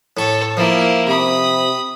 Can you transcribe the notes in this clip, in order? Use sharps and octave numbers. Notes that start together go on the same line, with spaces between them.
A2 A4 C#5 C#6
F3 A#3 E4
C3 B5 D#6